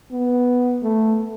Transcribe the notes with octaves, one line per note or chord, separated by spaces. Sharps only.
B3
A3